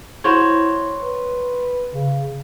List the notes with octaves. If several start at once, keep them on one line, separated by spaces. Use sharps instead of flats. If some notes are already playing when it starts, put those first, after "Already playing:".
E4 F#4 C5 C#5
B4
C#3